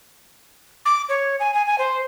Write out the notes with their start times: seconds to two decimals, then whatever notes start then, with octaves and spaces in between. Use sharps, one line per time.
0.85 D6
1.09 C#5
1.40 G#5
1.54 G#5
1.67 G#5
1.78 C5